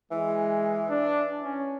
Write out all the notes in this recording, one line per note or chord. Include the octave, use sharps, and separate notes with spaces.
E3 G#3
D4
C#4